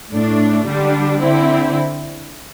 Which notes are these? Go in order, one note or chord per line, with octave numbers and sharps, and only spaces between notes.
A2 A3 D4
D3 G3 D4
D3 C4 E4